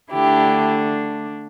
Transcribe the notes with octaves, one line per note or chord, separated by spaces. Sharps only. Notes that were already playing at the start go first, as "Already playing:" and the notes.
D3 A3 D4 E4 G4